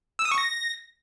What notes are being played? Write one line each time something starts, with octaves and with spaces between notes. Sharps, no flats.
E6
D#6
C#6
A#6